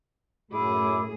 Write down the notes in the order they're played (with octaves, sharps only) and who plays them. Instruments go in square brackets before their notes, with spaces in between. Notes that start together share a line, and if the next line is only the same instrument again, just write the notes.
[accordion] F#2 E4 D6 [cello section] A2 [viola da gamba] G#4